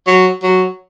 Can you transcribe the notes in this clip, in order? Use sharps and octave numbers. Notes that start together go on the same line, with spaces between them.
F#3
F#3